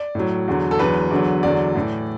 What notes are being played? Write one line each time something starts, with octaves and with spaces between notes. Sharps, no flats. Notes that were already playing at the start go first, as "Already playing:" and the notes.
Already playing: D5
A2 F#3
E2 D3 F#3
A4
E2 D3 F#3 B4
E2 D3 F#3
E2 D3 F#3 D5
A2 E3